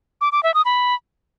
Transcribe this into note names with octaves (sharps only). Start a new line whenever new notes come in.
D6
D6
E5
D#6
B5